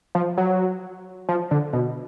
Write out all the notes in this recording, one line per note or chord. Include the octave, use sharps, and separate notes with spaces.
F3
F#3
F3
D3
B2